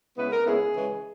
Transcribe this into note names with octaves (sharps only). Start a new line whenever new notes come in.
C#3 G#3 B3 E4 B4
A#4
C#3 G#3 B3 E4 G#4
C#3 E3 G#3